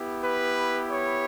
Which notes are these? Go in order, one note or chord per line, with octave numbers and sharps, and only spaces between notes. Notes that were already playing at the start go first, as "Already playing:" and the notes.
Already playing: B3 E4 G4
B4
C#5